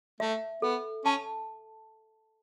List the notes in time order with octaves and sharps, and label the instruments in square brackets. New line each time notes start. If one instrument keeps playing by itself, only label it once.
[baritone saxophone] A3 [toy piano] E5
[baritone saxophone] B3 [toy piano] A4
[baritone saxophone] C#4 [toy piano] A5